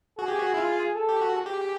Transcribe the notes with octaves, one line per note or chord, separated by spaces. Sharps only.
F#4 G#4
G4
F#4
E4
F4
A4
G4
F#4
G#4
G4